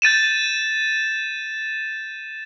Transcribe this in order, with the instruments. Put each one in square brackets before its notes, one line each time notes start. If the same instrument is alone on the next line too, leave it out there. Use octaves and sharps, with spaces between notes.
[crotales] G6 A6 D#7 E7